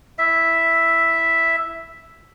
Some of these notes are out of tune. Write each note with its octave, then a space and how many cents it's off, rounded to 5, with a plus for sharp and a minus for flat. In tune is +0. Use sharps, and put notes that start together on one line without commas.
E4 +0 E5 +0